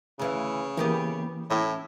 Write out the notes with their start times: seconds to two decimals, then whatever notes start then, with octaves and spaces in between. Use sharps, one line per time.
0.19 D2 C#3 E3 F5
0.77 E3 A#3 B3 G4 A#4
1.50 A2 C#4 E4